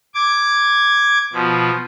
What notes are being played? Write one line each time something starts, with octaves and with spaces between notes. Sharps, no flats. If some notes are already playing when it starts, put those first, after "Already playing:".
D6 G#6
B2 F3